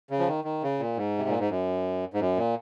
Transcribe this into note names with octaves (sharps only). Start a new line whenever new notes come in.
C#3
F3
D#3
D#3
C#3
A#2
G#2
C3
A#2
G#2
F#2
G#2
F#2
A#2